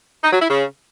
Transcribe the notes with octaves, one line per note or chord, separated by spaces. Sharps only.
D#4
F#3
E4
C#3